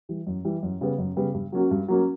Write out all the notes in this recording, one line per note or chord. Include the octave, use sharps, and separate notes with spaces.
E3 G3
F#2
E3 G3
F#2
C#3 G3 B3
F#2
C#3 G3 B3
G2
F#3 A#3 C#4 F#4
G2
F#3 A#3 C#4 F#4